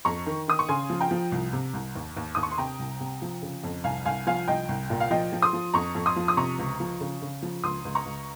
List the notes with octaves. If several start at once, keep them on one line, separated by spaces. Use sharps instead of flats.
F2 A#5 C#6
D#3
D#3 D#6
C#6
C#3 G#5 C6
F3
G5 A#5
F3
C2
C3
C2
D#2
D#2
D#2 D#6
C#6
C6
C3 G5 A#5
C2
C3
F3
C#3
F2
C2 F5 G#5
C2 F5 G#5
F3 F5 G#5
C2 D#5 G5
C2
A#2
F5
F3 D#5 G5
F3
C6 D#6
F3
F2 A#5 C#6
F2
C6 D#6
F3
D#6
C3 A#5 C#6
C#2
F3
C#3
C#3
F3
C#2 C6 D#6
C#2
A#5 C#6
C#2